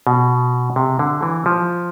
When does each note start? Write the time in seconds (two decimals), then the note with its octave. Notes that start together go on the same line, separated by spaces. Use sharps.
0.07 B2
0.76 C3
0.99 D3
1.23 E3
1.46 F3